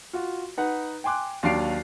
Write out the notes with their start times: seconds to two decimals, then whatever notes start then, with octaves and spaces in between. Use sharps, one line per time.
0.13 F4 F#4
0.57 D#4 B4 F#5
1.04 G5 G#5 C6 D6 F#6
1.43 D#2 F#3 D4 F5 C7 D7